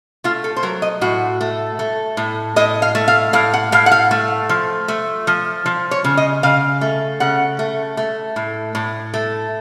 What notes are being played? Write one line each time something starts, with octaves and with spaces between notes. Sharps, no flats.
A3 F4
A4
C5
F#3 A#4
D#5
A2 F#4
A3
A3
A2
A2 D#5
F5
A3
F5
A2 F5
F#5
A2 F5
F#5
F5
A3
F3
A3
F3
F3
C#5
C#3
D#5
C#3 F5
A3
C#3 F#5
A3
A3
A2
A2
A3